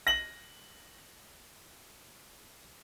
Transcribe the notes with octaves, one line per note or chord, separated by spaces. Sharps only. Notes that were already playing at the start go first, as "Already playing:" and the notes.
A#6 F#7